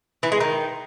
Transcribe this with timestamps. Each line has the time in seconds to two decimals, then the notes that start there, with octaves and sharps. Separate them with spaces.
0.23 E3
0.32 G#3
0.41 D#3